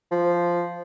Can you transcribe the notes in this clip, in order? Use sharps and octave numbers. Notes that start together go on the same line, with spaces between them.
F3